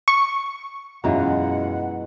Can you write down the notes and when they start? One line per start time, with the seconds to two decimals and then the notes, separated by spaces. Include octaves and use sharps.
0.08 C#6
1.04 F#2 B2 E3 G#3 F4 F#5 A#5